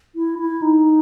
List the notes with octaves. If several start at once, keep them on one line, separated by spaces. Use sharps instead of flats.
E4
E4
D#4